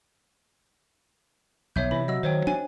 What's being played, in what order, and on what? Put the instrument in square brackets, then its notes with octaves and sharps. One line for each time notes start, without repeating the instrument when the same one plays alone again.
[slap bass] B1 [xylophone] C#5 E5 G6
[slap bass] C3 [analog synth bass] E3 [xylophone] B5
[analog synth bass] F#3 [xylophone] D#5 E6
[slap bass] D#3 [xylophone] C5 C#5 G5
[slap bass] D4 [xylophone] G#5